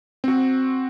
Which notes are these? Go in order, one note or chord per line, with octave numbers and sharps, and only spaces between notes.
C4 F#4